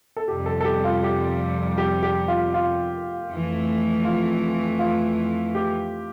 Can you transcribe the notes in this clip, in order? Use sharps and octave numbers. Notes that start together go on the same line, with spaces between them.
A4
F2 C3 G3 G4
A4
A4
G4
F4
G4
G4
G4
F4
F4
F2 E3 A3
F4
F4
G4